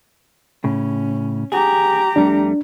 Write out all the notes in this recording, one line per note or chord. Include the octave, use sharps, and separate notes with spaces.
A2 C#3 C#4
G4 G#4 A#5
F2 G3 A3 D4